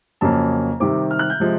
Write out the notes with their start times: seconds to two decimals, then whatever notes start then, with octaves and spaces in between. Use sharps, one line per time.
0.21 F2 C#3 F#3 A#3 C#4 A5
0.80 C3 D#3 G3 C4 D6
1.11 F6
1.19 F#6
1.30 G6
1.40 C3 F3 G#3